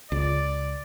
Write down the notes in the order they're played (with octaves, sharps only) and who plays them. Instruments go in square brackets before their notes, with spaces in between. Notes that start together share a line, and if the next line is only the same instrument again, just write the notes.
[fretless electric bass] C#2 [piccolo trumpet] D5